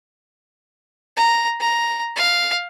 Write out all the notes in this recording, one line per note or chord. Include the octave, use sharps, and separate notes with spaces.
A#5
A#5
F5